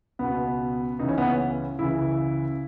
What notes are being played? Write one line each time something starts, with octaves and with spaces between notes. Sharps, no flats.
C#2 B2 B3
C#2 C#3 E3 D#4
C#4
B3
C#4
C#2 C#3 E3 E4